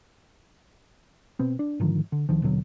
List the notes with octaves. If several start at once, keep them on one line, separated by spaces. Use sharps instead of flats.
B2 B3 C4
D4
G#2 D3 D#3 F3
D3
C#2 D#3 F3
D#2 B2 D3 F#3